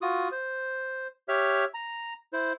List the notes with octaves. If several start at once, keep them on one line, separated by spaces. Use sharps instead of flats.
F4 F#4 D#6
C5
G4 C#5 E5 F6
A#5
E4 C5